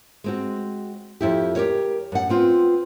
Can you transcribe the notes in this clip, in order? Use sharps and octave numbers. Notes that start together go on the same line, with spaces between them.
G#3 C4 F#4
F2 E4 G4
G4 A#4 C#5
F#2 F#5
B3 C4 F4